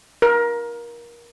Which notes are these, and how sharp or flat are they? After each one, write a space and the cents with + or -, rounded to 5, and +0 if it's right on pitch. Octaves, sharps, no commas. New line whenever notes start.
A#4 +25